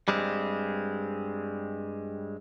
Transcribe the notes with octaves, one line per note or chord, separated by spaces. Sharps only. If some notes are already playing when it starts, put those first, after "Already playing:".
G2 G3 G#3 C4